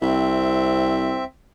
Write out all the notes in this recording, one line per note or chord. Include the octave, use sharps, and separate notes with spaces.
C2 C4 E5